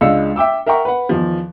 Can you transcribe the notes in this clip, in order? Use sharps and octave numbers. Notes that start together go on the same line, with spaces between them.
C#2 G#3 D4 F5 E6 C#7
E5 G5 D6 E6
A#4 E5 F#5 G5 A#5 C#6
B4 F#5
E2 D#3 F3